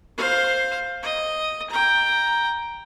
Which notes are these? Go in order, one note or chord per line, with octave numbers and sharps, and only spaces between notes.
C5 F5
D#5
G5 A#5